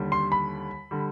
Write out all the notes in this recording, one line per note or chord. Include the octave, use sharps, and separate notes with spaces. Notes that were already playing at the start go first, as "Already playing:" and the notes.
Already playing: D#2 D3 G3
C6
B5
D3 G3